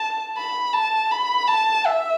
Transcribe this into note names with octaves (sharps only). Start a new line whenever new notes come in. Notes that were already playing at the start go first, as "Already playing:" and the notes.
Already playing: A5
B5
A5
B5
A5
E5